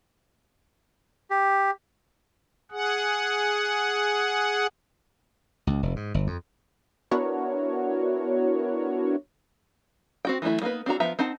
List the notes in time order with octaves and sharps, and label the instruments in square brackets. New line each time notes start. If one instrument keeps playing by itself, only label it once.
[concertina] G4
[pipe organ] G#4 F#5
[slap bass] C#2
F1
G#2
G1
F2
[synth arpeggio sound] B3 D4 E4 F#4 A#4 C#5
[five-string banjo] C4 F#4 G5
E3 F#3 G3 A3 E4
G3 A#3 B3 D#4 B4
C4 D4 F#4 A#5
F3 B3 E5 A#5
C4 D#4 F#5 A5